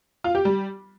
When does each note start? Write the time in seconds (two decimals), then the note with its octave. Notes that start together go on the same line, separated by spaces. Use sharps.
0.24 F4
0.35 G4
0.45 G3